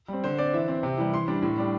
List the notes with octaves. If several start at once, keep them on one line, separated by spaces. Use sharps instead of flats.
G3 C4
D3 C5
C4 D5
E3 E5
C4
C3
E3 G3
E3 C6
G3 D4
A2
G3 D4